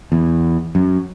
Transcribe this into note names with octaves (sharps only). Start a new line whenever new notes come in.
E2
F#2